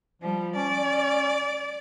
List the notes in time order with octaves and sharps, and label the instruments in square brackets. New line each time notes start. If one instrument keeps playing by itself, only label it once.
[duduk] F3 [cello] G3
[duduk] C#4 [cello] D5